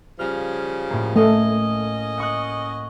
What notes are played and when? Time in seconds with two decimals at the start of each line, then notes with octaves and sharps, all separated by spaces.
0.19 C#3 F3 G3 F6
0.90 A2 A#3
1.16 A3 C#4 D#5
2.18 F#5 C#6 F#6